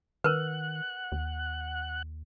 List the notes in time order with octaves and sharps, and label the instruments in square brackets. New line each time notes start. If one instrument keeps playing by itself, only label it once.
[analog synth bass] D#3 [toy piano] A#4 B4 [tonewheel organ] F#5 F#6
[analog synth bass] D#2